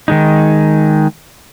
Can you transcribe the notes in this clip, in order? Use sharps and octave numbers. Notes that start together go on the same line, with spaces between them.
D#3 G#3 D#4